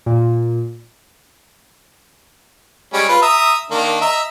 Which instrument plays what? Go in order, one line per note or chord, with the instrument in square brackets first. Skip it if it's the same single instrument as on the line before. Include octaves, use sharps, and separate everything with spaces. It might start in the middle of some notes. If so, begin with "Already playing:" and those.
[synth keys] A#2
[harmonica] G3 G#3 C#4
F4 B4
E5 A#5 D#6
D#3 A#3 D4
D#5 E5 A#5